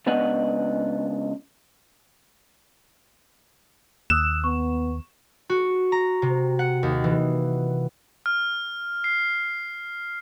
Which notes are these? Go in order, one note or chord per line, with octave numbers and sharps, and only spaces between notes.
C#2 B3 D4 D#5 F#5
D#2 D#6 E6 F#6 E7
B3 C#6
F#4
A#5
C3
F#5
D#2
E3
F6
C7